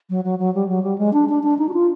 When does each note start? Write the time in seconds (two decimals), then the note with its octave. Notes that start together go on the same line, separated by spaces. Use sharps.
0.10 F#3
0.24 F#3
0.39 F#3
0.54 G3
0.68 F#3
0.83 G3
0.98 G#3
1.13 D4
1.29 D4
1.43 D4
1.58 D#4
1.69 F#4
1.73 F4